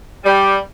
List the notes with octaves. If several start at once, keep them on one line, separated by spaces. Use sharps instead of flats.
G3